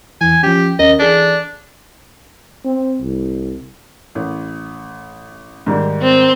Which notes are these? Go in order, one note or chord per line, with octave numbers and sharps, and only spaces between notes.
E2 E3 G#5
F3 C#4 G4
D#2 C#4 A#4 D#5
E3 D4 G#4 A4
C4
C2
A1
G#2 D#3 G3
C4